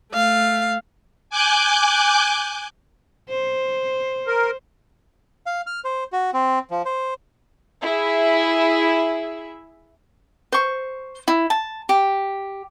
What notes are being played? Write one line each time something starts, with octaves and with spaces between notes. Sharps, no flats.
A3 F5
G#5 D6 F#6 G6
C5
A#4
F5
F6
C5
F#4
C4
F3
C5
E4 G#4 E5
C5 C#6
E4
A5
G4